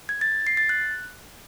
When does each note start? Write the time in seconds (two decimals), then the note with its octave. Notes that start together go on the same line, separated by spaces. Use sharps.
0.09 G#6
0.21 A6
0.47 C7
0.57 A6
0.69 F#6